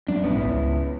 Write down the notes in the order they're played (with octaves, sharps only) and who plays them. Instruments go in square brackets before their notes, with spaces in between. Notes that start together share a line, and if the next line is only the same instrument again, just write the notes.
[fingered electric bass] F#3 G3 C#4 [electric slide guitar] D4
[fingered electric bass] A#1 G#2 [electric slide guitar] B3 C#4 E4
[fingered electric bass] C#2